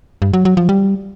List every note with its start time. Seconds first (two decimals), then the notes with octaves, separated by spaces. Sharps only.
0.22 G2
0.33 F#3
0.45 F#3
0.57 F3
0.69 G3